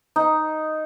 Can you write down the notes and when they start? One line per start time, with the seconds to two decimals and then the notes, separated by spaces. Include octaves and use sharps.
0.16 D#4